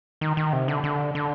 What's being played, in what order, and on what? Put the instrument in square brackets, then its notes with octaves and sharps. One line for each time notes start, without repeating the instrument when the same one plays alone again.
[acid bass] D#3
D#3
C3
D3
D3
D3